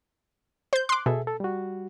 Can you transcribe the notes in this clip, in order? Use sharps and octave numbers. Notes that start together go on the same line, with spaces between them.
C5 G6
C6 D6 F#6
B2 G#4 A4 E5
A4
G3 F#4